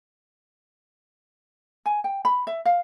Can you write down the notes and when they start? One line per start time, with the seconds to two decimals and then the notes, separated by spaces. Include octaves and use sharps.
1.86 G#5
2.04 G5
2.25 B5
2.47 E5
2.65 F5